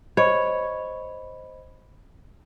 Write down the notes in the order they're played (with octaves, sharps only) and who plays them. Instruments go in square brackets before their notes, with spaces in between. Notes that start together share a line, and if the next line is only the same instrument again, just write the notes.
[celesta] C5 D#5 B5 [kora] C#5